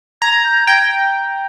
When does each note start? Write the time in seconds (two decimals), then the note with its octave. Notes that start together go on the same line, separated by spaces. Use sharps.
0.22 A#5 G#6
0.44 G6
0.67 G5 G#6